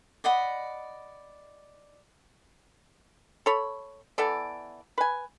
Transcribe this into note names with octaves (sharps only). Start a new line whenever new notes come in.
D5 D#5 F#5 B5
A4 C#5 B5
E3 B3 A4 D5
B4 G#5